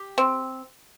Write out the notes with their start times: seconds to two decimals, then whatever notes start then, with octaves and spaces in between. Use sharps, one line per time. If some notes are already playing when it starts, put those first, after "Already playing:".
Already playing: G4
0.18 C4